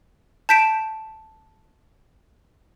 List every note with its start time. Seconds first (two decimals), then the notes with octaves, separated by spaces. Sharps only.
0.49 A5 G6 B6 D7 E7